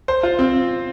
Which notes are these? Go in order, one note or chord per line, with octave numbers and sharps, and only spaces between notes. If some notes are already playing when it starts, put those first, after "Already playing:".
C5
F4
C4